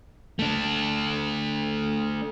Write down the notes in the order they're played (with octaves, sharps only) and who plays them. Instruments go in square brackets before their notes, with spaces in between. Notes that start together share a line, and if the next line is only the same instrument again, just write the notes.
[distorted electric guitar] A3 D4